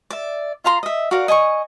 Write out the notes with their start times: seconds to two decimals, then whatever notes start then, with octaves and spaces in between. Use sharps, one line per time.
0.10 D5 E5
0.64 F4 F5 A#5 C6
0.83 D#5 E5
1.11 F#4 A#4 D5 F5
1.28 D#5 G#5 A5 C#6